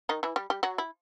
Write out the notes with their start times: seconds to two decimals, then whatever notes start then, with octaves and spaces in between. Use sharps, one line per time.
0.09 D#3 D#4
0.23 E3 E4
0.36 G3 G4
0.50 G3 G4
0.63 F#3 F#4
0.78 E4